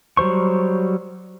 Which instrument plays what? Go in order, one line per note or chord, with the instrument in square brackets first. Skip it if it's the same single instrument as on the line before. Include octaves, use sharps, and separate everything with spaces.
[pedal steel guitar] F#3 G3 C5 C#6